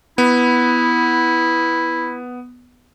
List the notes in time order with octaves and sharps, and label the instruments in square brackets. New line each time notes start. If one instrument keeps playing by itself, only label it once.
[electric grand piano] B3 [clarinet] E4